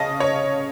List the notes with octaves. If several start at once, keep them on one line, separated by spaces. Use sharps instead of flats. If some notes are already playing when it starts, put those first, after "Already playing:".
Already playing: C#3 C#4 D#5 A5
C#5